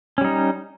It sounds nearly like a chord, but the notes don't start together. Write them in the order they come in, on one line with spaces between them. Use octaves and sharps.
C#4 G3 D#4